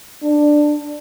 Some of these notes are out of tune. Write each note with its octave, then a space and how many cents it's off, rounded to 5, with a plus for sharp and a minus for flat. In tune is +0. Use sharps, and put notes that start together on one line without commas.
D4 +10